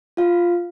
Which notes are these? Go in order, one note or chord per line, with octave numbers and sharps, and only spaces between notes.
F4 F5